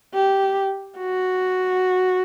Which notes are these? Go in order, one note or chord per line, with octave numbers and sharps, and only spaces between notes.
G4
F#4